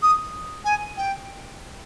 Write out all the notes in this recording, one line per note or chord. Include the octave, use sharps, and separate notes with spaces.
D#6
G#5
G5